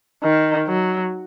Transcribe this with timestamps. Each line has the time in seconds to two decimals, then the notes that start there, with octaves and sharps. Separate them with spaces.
0.23 D#3
0.68 F#3